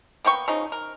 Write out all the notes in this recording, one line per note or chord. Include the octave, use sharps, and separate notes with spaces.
A#3 B3 G5 C#6
C#3 F3 C#4 D#4
A#4